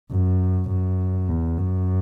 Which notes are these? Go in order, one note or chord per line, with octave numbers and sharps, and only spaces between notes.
F#2
F#2
E2
F#2